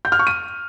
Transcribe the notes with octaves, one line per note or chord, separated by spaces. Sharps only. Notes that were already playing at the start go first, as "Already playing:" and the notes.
G6
F6
C#6
D#7